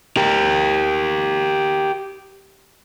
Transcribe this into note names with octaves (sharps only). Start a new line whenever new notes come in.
G4 A#4